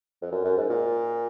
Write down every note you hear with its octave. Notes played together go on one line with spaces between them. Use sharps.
F2
F#2
F#2
G#2
A#2